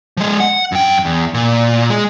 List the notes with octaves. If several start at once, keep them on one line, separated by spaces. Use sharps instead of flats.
F3 G#3
F#5
F#2 G5
E2
A#2
G#3